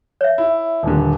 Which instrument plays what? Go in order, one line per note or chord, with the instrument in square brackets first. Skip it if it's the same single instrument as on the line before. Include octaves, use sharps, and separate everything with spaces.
[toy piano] C#5 E5
[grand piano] E4
D#1 D3